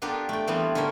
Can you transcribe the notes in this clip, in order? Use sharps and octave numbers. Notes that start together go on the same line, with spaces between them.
B3 D4 F4 G4 A4 A#4
A3 G5
E3 G3 B3 C4 E4 F4
D3 C#4 E4 A#4 C5